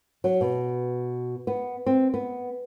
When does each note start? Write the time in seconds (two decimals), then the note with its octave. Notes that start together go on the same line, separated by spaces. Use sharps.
0.24 F#3
0.41 B2
1.47 B3
1.86 C4
2.14 B3